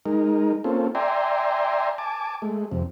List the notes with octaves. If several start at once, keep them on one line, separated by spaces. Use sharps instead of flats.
G#3 D#4 A#4
A#3 C4 C#4 F4 A4
D5 E5 G5 G#5 A#5 C6
G#5 A5 D6
G#3 A3
F2 C3